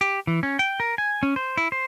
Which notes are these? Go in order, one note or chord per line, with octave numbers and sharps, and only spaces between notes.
G4
E3
C#4
G5
A#4
G#5
C#4
C5
E4
C5